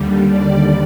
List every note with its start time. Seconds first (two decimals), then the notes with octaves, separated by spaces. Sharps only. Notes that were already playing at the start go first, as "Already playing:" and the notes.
Already playing: D#2 D3 G3
0.27 D5